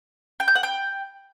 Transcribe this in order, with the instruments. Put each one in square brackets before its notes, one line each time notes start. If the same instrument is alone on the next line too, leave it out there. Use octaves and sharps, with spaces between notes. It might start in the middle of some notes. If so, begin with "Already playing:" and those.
[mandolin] G5
G6
F#5
G5